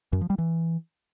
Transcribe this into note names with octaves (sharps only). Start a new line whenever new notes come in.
F#2
F3
G3
E3